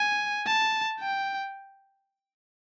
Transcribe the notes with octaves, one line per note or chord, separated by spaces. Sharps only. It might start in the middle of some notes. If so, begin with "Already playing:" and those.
Already playing: G#5
A5
G5